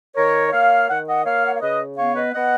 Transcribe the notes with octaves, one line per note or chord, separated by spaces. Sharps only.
D#3 A#4 C#5
A#3 C#5 F5
D#3 F#5
D#5 F#5
A#3 C#5 F5
F#5
F5
C#3 B4 D#5
B3 C#5 F5
B4 D#5
B3 D#5 F#5